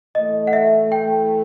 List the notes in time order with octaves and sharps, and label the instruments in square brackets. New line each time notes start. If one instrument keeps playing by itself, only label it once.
[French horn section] A2 E3 A3 [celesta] D#5
[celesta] F#5
E5
G5